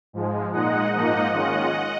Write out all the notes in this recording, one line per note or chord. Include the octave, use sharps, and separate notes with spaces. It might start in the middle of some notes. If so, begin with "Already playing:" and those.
G#2 F3 G#3
A#2 G#3 D#4 D#5 F#5
G#2 F3 A#3 D#4 D#5 F#5
D#3 G#3 C#4 F4 D#5 F#5